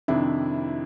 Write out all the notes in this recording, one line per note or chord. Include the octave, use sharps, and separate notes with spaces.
F2 C3 D#3 D4 E4